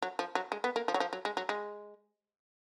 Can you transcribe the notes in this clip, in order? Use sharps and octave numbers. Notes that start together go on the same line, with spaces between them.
F#3
F3
F#3
G#3
B3
A#3
F3
F#3
F3
F#3
G#3
F#3
G#3